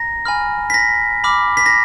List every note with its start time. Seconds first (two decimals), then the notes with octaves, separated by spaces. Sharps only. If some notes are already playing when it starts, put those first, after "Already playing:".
Already playing: A#5 A#6
0.25 G#5 B5 F6
0.70 B6
0.74 A#6
1.24 B5 D6 F6
1.57 B6
1.66 A#6